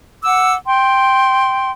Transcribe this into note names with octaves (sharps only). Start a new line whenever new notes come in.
F#5 D6 E6
G5 C6